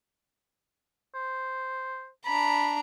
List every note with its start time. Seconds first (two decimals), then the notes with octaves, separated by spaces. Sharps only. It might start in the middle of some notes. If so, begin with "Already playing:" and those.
1.15 C5
2.25 D4 A#5 B5